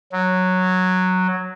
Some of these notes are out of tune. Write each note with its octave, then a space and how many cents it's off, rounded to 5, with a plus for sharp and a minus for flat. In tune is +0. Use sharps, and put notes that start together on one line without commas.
F#3 -5